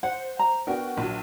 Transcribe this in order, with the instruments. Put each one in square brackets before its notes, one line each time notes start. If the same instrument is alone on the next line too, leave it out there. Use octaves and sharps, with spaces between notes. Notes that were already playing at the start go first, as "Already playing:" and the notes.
[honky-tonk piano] C5 [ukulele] F#5
[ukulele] A#5
[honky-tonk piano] B3 D4 F#4 [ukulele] A#4 G5
[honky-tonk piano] A#1 F#3